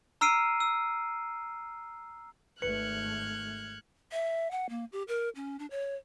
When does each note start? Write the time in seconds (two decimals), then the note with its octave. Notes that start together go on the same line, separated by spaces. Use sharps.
0.21 A#5 E6 F6 C7 D7 D#7
0.60 E6
2.62 G#1 A3 B4 F6 F#6 G#6 C#7 F#7
4.12 E5
4.51 F#5
4.69 A#3
4.92 G4
5.08 A#4
5.36 C#4
5.59 D4
5.71 C#5